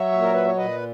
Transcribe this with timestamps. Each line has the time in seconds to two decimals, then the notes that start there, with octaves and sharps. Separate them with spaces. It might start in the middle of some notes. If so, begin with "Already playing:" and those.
Already playing: F#3 C#5 E5
0.11 A#2
0.21 A#4
0.34 B4
0.45 C#5
0.57 A#2 B4 D#5